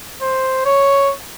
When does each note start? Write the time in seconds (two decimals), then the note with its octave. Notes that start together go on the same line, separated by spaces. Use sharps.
0.21 C5
0.66 C#5